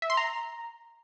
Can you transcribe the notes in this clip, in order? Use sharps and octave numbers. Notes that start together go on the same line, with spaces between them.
E5
C6
A#5